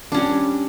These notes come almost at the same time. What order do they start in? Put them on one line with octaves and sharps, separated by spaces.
D4 C#4 G3